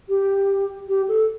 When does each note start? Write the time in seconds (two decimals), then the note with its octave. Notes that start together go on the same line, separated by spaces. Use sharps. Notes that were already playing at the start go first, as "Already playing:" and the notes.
0.09 G4
0.88 G4
1.08 A4